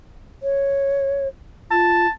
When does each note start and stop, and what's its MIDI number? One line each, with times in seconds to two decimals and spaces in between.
0.43 1.28 73
1.71 2.07 65
1.71 2.10 81